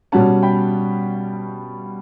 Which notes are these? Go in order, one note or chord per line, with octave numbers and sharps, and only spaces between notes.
B2 G3 C#4 F#5 A5
G5 B5